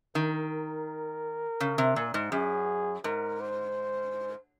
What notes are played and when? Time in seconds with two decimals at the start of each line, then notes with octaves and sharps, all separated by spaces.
0.15 D#3 A#4
1.60 C#3
1.78 C3
1.96 A#2
2.14 G#2
2.32 F#2 G#4
3.04 G#2 A#4
3.40 C5